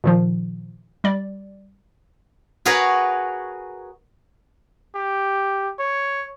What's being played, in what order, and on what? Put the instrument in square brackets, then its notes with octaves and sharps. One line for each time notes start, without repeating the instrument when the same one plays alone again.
[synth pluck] A#2 D#3 F3
G3 D5
[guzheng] F#4 G#4 A#4 B4 C#5
[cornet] G4
C#5